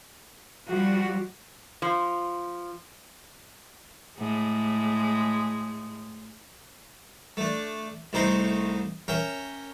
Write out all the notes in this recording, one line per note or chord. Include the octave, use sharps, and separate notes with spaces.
F3 G3 F#4
F3
A2 G#3
A3 D4
C2 C3 A3 D#4 C5 A#5
C#4 A#4 E5 G5